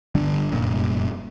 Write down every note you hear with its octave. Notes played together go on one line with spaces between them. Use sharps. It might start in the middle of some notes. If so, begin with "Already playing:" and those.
G1 D3 G3 D4
F1 F#2 A#2 G3